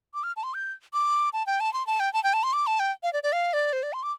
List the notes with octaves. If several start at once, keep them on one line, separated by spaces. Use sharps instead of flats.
D6
F6
A5
C6
G6
D6
A5
G5
A5
C6
A5
G5
A5
G5
A5
C6
D6
A5
G5
F5
D5
D5
F5
D5
C5
D5
C6
D6